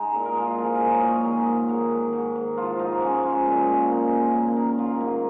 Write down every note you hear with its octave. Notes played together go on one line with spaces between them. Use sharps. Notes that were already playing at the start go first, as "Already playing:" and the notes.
Already playing: G#3 D#4
G#4
A#2
A#4
G#3
F4
F3 G#4
A#4
A#2
C#5
A#2
D#5
D#3 G#4
G#2
G#2
D#3
G#2
G#2
F3 F4
G#2 D#4
G#2 C#4
G#3 F4
A#2
G#3
A#3
C#3
A#3
D#3 A#4
G#2 F4
G#2 D#4